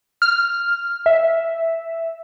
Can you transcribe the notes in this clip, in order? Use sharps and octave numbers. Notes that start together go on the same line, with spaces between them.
F6
E5